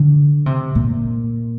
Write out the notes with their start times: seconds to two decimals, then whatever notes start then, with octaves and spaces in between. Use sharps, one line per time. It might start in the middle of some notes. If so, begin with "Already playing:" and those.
Already playing: D3
0.46 C3
0.75 A#2